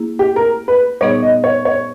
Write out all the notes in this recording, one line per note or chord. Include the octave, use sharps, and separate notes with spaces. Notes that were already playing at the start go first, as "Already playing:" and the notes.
Already playing: A#3 E4 G#4
G4
A#4
B4
A#2 G3 B3 D#4 G#4 C#5
D#5
C#5
C#5